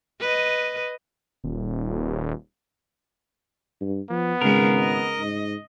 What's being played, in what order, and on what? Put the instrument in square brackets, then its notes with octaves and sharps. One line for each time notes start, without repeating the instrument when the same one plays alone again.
[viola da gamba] B4 D#5
[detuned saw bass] D#1
[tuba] G2
[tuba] F3 [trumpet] B3
[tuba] G#1 [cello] C#3 G#3 [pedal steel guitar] A#4
[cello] D#5
[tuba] G#2